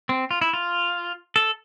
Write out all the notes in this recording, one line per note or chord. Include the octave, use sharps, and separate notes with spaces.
C4
F4
E4
F4
A4